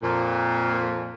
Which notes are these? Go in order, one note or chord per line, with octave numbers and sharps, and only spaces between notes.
F2 A#2